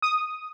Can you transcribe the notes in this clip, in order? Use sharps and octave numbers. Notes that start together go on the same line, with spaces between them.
D#6